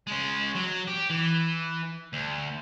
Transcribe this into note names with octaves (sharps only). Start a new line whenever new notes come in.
G#3 C#4
F#3
G4
E3
D2